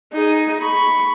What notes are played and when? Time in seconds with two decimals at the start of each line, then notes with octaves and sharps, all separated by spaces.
0.13 D#4 G#4
0.60 B5 C#6